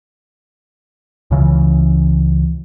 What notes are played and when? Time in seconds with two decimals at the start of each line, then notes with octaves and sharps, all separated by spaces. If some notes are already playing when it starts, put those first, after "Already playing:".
1.31 C#2 C#3 E3